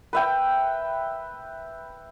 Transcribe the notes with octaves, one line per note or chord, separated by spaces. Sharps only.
B4 E5 G5